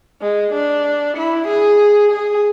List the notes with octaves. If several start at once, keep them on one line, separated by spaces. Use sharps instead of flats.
G#3
D4
E4
G#4
G#4